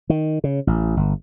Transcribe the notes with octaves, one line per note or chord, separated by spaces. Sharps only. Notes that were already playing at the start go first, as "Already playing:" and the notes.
D#3
C#3
A1
G1